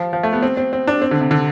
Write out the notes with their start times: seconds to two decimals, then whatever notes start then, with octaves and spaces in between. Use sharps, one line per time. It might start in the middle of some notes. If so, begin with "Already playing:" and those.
Already playing: F3
0.13 F3
0.23 A3
0.33 B3
0.43 C4
0.57 C4
0.73 C4
0.87 D4
1.02 C4
1.11 D3
1.21 C3
1.31 D3